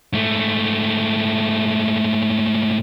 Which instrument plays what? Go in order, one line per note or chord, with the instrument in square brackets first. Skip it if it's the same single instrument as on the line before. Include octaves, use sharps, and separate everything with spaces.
[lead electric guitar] G#2 A3